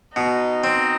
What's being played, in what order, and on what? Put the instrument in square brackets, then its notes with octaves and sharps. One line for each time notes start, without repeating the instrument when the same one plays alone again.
[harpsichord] B2 [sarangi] D#4
[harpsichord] C4